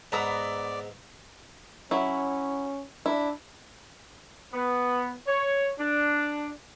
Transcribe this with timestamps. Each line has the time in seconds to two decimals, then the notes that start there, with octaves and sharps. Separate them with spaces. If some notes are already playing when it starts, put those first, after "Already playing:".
0.12 G#2 B3 D5 A#5 E6
1.91 F#3 C#4 E4
3.06 D4 E4
4.53 B3
5.27 C#5
5.80 D4